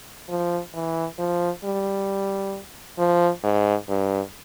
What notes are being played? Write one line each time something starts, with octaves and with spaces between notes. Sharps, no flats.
F3
E3
F3
G3
F3
G#2
G2